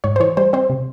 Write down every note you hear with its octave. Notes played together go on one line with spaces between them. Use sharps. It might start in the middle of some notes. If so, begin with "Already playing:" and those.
G#2 C#5
C5
E3 C#5
G3 C5
C4 C5
C3